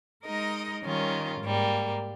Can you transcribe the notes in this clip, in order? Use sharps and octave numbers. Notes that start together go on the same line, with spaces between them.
G#3 D#4 A#4 D#5
D#3 G3 C#4 F4 A#4
G#2 G3 A#3